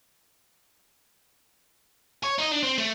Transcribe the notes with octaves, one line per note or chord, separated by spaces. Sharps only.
C#5
D#4 D#5
D4
C4
A3